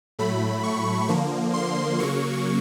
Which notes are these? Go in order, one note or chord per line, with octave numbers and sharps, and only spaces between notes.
A2 F#3 A3 B5
C#6
D3 F3 A#3
C6
C#3 F#3 A#3 C#6